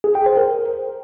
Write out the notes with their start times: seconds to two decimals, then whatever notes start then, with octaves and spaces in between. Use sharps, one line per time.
0.04 G#4
0.15 G5
0.26 C5
0.37 A#4